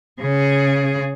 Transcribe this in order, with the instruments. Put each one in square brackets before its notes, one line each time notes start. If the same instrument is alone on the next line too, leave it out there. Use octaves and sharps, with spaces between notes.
[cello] C#3 G#4